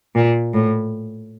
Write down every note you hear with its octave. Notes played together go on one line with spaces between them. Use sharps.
A#2
A2